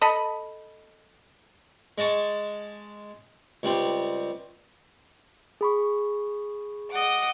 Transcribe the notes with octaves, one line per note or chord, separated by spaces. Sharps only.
A4 D#5 B5
G#3 D#5 A5 C#6
C#2 G3 C4
G#4 B5 C#6
D#5 F#5 D6